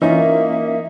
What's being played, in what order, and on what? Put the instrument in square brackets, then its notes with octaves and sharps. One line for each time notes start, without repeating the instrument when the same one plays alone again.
[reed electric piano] E3 C#4 F4 [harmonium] A#3 [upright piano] D#4 [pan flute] E5